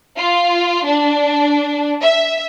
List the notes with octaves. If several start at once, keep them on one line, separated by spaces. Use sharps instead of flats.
F4
D4
E5